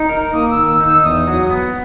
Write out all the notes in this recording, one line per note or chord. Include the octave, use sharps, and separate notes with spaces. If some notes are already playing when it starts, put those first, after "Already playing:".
Already playing: D#4
A#4
A#3 D#6
E6
D#3
E6
D#4
E6
E2 D#6
F#3
B3